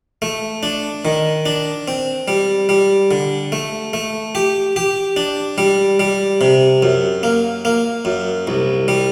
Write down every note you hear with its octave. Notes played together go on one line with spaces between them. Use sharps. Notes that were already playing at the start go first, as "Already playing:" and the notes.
A3
D4
D#3
D4
C4
G3
G3
D3
A3
A3
G4
G4
D4
G3
G3
C3
F#2
A#3
A#3
F#2
C2
G3